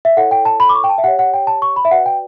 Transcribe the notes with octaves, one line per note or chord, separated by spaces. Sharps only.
E5
E4 A4 C#5 F#5
G5
A5
B5
D6
C#6
G5
A5
E5
G4 C#5 F#5
F#5
G5
A5
C#6
B5
E5
F#4 B4 D5 F#5
G5